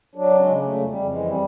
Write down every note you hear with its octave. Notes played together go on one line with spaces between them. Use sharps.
F#3 D4
C#3
G#3
C#3
F2 A3
F2
G3
F2
E3 G#3
G3